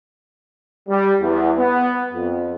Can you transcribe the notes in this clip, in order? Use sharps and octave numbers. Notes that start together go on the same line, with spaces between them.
G3
E2
B3
F2